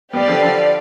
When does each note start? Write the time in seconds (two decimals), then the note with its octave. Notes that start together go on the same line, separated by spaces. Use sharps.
0.13 G3 B3 G4 B4 D5 F5
0.28 D3 F3
0.42 D3 F3